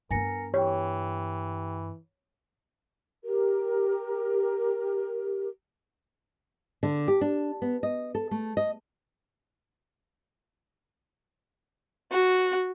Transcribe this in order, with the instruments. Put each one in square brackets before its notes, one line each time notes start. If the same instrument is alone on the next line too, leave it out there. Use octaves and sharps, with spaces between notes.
[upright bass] G2 B3 [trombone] A#4 [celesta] G#5 A#6 C#7
[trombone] E3 [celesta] G4 G5 [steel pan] C#5
[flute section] G4 A#4
[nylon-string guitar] D3
G4
D4
B3
D#5
A4
A3
D#5
[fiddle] F#4